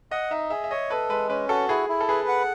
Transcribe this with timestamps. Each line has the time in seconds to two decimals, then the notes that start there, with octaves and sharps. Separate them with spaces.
0.11 D#5 F#5
0.31 D#4 E5
0.50 G#4 E5
0.64 E5
0.71 C#5 D#5
0.90 A4 B4
1.10 G#3 B4
1.29 C#4 B4
1.49 F#4 A4
1.69 E4 G#4
1.89 E4
2.01 A4
2.09 G#4 B4
2.28 F#5